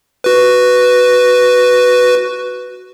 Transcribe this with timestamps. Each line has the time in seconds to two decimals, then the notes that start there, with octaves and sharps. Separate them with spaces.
0.24 F#4 B4